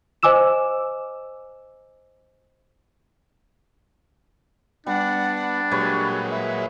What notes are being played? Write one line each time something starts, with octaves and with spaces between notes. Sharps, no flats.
C5 D#5 G#5 D6 E6 E7
G3 B3 D4 F#5
A#2 F#3 G#3 G4 B4 C#5 B5
E5